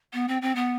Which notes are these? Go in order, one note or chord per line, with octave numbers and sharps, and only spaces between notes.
B3
C4
C4
B3